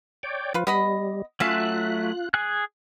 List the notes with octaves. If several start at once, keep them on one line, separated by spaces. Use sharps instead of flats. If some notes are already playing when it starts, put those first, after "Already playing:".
C#5 D5 G5
F3 F4 B4
G3 B3 D#5 B5
F#3 A3 C#4 F4 E5 F5 F#6
G#4 G#5 F#6